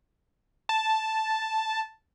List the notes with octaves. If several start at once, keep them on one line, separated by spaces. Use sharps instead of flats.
A5